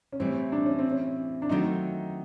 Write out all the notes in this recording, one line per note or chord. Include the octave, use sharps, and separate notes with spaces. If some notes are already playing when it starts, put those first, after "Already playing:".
C#4
A2 E3 G3 C4
D4
C#4
C4
C#4
D4
D#3 F#3 A3 C4 D#4 F4